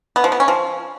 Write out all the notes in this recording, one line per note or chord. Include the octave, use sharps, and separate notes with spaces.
B3
F3
B3
C#4
F3